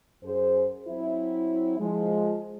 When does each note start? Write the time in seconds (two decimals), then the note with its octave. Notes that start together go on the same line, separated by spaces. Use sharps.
0.23 F#2 G#4 C5
0.87 F#3 C4 E4
1.79 F3 G#3